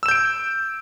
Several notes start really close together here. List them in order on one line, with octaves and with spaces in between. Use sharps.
E6 E7 G6 D7